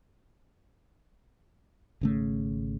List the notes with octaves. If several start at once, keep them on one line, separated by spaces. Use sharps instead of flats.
G#1 C#3 A3